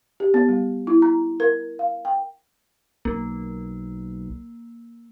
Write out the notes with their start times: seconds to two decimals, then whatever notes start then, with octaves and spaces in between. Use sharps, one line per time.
0.20 G4
0.34 B3
0.49 G3
0.87 E4
1.02 A#5
1.40 A#4
1.79 F5
2.05 G5
3.05 B1 A#3